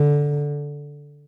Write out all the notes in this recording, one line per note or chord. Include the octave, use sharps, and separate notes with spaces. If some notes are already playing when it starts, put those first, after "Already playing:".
Already playing: D3